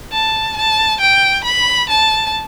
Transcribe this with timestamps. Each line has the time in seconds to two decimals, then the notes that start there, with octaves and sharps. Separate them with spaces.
0.12 A5
0.56 A5
1.00 G5
1.44 B5
1.89 A5